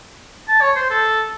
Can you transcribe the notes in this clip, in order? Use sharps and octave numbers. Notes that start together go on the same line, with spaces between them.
A5
C#5
C5
A4